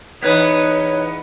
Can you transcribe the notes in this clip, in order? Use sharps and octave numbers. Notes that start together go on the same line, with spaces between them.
E2 B3 D#4 B4 C#5 F#6 B6